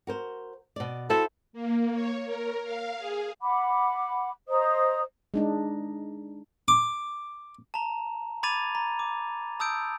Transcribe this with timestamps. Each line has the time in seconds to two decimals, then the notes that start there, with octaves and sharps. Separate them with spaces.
0.07 F#4 A#4 C5
0.76 B2 D5
1.10 E4 F#4 A4 C5
1.53 A#3
1.93 C#5
2.25 A#4
2.64 F5
2.99 G#4
3.41 F#5 B5 D6
4.49 C5 D#5 A#5 D#6
5.34 G#3 D4 D#4
6.68 D6
7.74 A5 A#5
8.43 B5 D6 G#6 A6 D#7 F7
8.75 A#5
8.99 D6
9.60 A5 D#6 E6 G6 D7